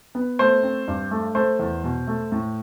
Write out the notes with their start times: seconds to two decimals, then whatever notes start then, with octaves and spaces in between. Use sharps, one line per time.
0.15 B3
0.39 A3 C5
0.63 C4
0.88 G2
1.11 A3
1.35 A3 C5
1.59 E2
1.84 B2
2.07 A3
2.32 A2